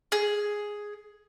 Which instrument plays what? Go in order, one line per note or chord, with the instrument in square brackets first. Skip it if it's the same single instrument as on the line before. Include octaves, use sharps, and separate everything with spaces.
[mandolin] G#4